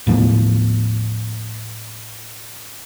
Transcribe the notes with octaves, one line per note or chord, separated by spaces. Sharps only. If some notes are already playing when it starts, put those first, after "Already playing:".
D#2 A2 F3 B3